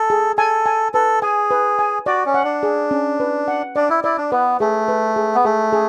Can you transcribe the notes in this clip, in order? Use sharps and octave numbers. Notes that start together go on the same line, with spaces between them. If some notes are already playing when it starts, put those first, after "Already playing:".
Already playing: A4 G#5
G#4
A4 G#5
G#5
A4 B4
G#4 G#5
B4
G#5
F#4 D5
C#4
F#5
D4
G#4
C#4
B4
F#5
D4 D5
E4
E4 D5
D4
B3 B4
A3 G#4
B4
G#4
B3
A3 G#4
G#4